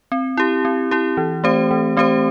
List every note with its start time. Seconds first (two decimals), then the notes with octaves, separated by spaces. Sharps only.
0.12 C4
0.37 E4 G4
0.65 C4
0.91 E4 G4
1.17 E3
1.44 A3 C4 G4 C5
1.71 E3
1.97 A3 C4 G4 C5